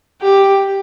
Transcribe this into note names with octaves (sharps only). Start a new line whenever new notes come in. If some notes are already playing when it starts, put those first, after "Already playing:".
G4